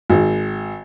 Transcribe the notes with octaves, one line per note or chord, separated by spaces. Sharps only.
G#1